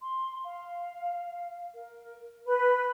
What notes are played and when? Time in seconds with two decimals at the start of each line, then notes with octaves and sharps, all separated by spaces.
0.01 C6
0.44 F5
1.74 A#4
2.46 B4 B5